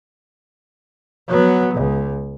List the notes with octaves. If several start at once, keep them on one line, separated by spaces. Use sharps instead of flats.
F#3 B3
C#2